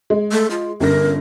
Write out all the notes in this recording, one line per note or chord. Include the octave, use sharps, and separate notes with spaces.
G#3
A3
F4
G1 C#4 A#4 A#6